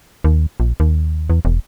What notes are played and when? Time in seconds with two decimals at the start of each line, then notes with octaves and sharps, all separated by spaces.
0.24 D#2
0.60 A#1
0.80 D#2
1.30 E2
1.45 E1